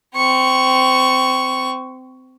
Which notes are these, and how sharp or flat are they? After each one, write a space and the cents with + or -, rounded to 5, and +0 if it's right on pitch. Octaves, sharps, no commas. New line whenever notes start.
C4 -20 C#6 +0